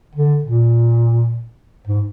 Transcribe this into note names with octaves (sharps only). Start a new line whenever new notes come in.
D3
A#2
G#2